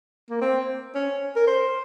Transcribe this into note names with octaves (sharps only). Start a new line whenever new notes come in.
A#3
C4
C#4
A#4
C5